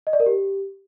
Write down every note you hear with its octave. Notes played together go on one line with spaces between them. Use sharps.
D#5
D5
A#4
G4